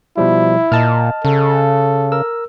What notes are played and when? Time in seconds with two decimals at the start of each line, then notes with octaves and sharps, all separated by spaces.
0.17 B2 F3 G3 E4
0.72 A#2 D#5 A5 F6
1.25 C#3 A4
2.12 A#4 E6